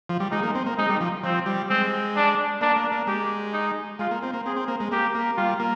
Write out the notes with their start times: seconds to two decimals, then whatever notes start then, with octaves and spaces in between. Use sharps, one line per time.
0.09 F3
0.20 G3
0.32 G#3 D#4
0.43 A#3
0.55 C4
0.66 A#3
0.78 G#3 D#4
0.89 G3
1.01 F3
1.24 F3 C4
1.46 G3
1.69 G#3 C4
2.16 D4
2.61 A#3 D4
2.76 A#3
2.92 A#3
3.07 G#3 G4
3.53 D#4
3.99 G#3 F4
4.11 A#3
4.23 C4
4.33 A#3
4.46 C4 G#4
4.56 C4
4.68 A#3
4.80 G#3
4.91 A#3 G4
5.15 A#3
5.37 G3 F4
5.60 A#3